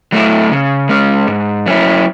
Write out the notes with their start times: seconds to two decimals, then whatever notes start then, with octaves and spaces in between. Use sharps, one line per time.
0.12 F#3 A3 E4
0.50 C#3
0.89 G#3 C#4
1.27 G#2
1.66 F#3 C#4 E4